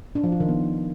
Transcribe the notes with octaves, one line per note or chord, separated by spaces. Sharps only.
D4
F3
F4
D#3
B3